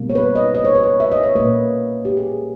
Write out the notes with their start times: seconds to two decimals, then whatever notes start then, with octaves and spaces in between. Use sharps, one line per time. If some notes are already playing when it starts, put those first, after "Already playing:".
Already playing: B2 G3 A#3
0.10 C#5
0.15 B4
0.35 D#5
0.55 D#5
0.65 C#5
0.75 B4
0.83 C#5
1.00 E5
1.12 D#5
1.23 C#5
1.35 A#2 A#3 B4
2.05 G4
2.17 G#4